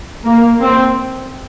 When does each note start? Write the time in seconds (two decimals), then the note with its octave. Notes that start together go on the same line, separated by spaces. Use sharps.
0.24 A#3
0.61 C4